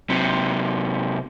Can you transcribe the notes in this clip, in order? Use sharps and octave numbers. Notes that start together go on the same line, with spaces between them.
C3 F#3